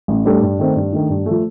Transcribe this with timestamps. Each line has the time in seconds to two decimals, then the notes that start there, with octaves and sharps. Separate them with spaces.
0.08 A1
0.25 A2 G3 D4 A4
0.42 G2
0.59 D#3 A3 C4
0.76 G2
0.93 D#3 A3 D4
1.10 G2
1.26 F3 A3